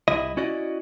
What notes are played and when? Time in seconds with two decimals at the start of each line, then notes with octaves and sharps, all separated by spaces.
0.08 C2 E4 D#5
0.37 C#4 E4 F#4 D5 D#5